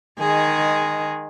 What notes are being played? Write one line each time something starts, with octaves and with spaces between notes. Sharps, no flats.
D#3 G#3 G#4